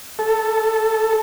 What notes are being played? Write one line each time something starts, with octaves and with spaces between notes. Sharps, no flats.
A4